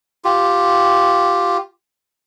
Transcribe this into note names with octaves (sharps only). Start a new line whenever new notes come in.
F4 G4